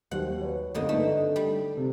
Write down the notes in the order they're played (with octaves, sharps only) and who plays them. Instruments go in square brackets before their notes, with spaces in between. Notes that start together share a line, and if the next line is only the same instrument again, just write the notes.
[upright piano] D#2 F#3 C5 [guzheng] F#5
[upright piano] B4 C#5
[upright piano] F#1 A#3 C4 [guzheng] G2 D3 D#4
[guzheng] A3 [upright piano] D4 D#4 B4
[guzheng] G3
[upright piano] C3